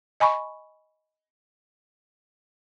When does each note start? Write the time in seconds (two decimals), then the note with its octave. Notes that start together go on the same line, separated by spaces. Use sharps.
0.20 D#5 G#5 B5 C#6